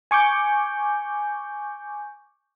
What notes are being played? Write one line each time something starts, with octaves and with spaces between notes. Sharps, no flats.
G#5 C#6 D6 G6